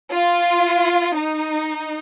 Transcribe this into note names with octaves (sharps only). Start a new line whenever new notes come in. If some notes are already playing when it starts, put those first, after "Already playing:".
F4
D#4